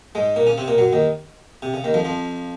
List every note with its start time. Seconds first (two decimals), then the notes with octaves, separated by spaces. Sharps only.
0.15 G#2 G#3
0.36 A#2 A#3
0.47 C#3 C#4
0.58 C3 C4
0.68 A#2 A#3
0.78 F#2 F#3
0.93 D#2 D#3
1.62 C3
1.74 C#3
1.84 D#2 D#3
1.94 F2 F3
2.05 F2 F3